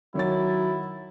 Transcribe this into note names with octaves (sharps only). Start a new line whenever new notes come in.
D#3 F#3 E4 C#5 A6